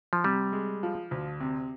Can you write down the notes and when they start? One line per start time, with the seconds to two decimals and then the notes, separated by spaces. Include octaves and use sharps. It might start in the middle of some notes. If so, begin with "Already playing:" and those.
0.13 F3
0.24 C3 G3
0.53 G#3
0.83 F3
1.11 D2
1.40 C3